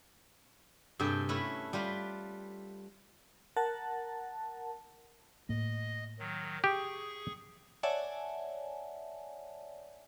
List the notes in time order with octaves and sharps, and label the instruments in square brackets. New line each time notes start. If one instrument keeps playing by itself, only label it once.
[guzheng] G2 C3 G#4 A4 G5
A3 C#4 E4 B4
G3 F4 B4 C6
[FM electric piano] A#4 F#5 A5
[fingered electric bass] A2 A#3 [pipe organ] D#5
[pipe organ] D#3 F#3
[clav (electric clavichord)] G4 [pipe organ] G#4 C#6
[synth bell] C#5 D5 E5 F#5 G#5 A5